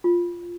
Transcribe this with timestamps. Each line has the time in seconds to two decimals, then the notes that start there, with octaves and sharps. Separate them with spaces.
0.04 F4